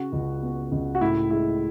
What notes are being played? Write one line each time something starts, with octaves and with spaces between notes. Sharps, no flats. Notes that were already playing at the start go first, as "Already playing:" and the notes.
Already playing: C#3 F#4
C#2
B3
C#2
F#4
A2 E4
G#3 E4